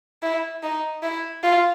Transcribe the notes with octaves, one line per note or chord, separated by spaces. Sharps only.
E4
D#4
E4
F4